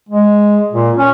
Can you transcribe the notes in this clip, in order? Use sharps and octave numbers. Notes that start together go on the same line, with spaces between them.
G#3
A#2
C#4